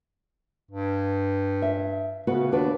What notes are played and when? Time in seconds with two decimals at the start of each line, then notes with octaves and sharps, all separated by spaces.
0.71 G2
1.62 E5
2.27 C#3 B3 F#4 B4
2.52 D#2 D4 F#4 B4